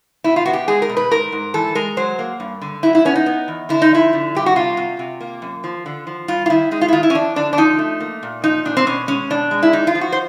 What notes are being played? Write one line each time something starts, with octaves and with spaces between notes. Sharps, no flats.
B2 E4
F4
B3 F#4
G4
G#3 G#4
A#4
B2
B4
G#2 A#4
G#2
E3 A4
G#3 A#4
F#3 C5
A#3
G2
D3
F#3 E4
E4
B3 C#4
D#4
B3
E2
D3 E4
D#4
F3 E4
D3
G2 G4
F#4
C3 F4
C3
C3
A#3
F#2
F3
D3
F3
G2 F4
F4
D#3 E4
G#3 D#4
F4
E4
D#3 F4
E4
C#4
F2 D4
D3 D4
D4
F3 D#4
A3
A#3
A#2
F3 D#4
A#2 D4
C4
B2 C#4
G#3 C#4
B2 D4
G#3
E4
F2 D#4
F4
F3
F#4
C5